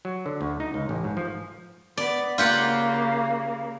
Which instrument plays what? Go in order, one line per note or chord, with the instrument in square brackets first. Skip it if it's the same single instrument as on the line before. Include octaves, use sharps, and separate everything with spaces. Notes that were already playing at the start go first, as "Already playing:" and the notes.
[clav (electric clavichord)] F#3
D3
D2
D#4
C#2
A1
G#2
F3
[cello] B3 [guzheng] D5
[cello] C#3 A#3 [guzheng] F4 G4 F#5